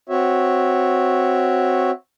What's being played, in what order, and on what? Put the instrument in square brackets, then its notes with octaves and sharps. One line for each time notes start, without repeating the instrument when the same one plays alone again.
[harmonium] C4 F#4 C#5 E5